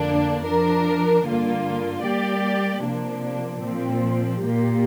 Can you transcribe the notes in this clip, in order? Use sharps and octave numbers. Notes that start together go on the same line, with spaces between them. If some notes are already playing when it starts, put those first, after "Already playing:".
Already playing: F2 D3 A#3 D4
F3 D4 A#4
G2 D3 A#3 F4
G3 A#3 G4 D5
C3 F3 A#3 D4
A#2 F3 C4
A#2 A#3 G4